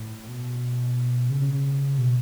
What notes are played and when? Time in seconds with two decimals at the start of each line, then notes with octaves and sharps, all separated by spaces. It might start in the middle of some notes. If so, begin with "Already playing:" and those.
Already playing: A2
0.28 B2
1.30 C#3
1.42 C#3
1.53 C#3
1.98 B2